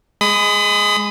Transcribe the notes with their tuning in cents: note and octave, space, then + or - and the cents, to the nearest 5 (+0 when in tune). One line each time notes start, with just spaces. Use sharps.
G#3 +0 B5 +35 D#6 +0